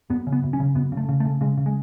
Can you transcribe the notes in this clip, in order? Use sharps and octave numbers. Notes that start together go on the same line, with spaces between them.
F#2 B3
C#3
B3
F#2
C#4
C#3
F#2 B3
C#3
A3
C#3
A3
C#3
C#3 G#3
C#3
G#3